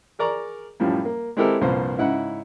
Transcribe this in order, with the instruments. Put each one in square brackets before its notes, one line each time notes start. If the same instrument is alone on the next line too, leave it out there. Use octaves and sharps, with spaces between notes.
[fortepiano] G#4 A#4 D5 A#5 C#6
F#2 A2 F3 G3
A#3
G#3 C4 E4 G4 A4 A#4
C2 G2 A#2 F3 C5
G#2 C#3 E4 F#5